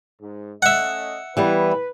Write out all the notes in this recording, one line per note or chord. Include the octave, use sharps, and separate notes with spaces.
G#2
A3 C#4 D#5 E5 F#5
E3 G3 B3 B4